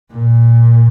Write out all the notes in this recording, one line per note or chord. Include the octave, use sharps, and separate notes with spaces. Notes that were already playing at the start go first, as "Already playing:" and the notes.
A#2